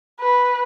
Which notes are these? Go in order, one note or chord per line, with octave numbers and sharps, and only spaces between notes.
B4